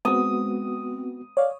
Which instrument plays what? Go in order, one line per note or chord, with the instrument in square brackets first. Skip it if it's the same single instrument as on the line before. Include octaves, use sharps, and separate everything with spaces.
[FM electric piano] G#3 C4 [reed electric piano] B3 F#4 [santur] D#6
[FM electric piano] C#5 [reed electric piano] D5 F5